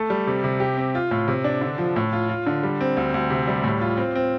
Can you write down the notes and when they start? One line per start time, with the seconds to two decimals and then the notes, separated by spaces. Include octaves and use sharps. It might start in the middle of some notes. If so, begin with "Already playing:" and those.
Already playing: A3 A4
0.10 G3
0.27 C3
0.44 C3
0.60 G4
0.77 C4
0.95 F4
1.11 A2
1.28 C3
1.44 D4
1.61 D3
1.78 F3
1.96 A2
2.13 F4
2.29 F4
2.46 D3
2.63 G3
2.80 C4
2.97 D2
3.14 D2
3.30 C3
3.48 G3
3.64 A2
3.81 F4
3.97 C4
4.15 C4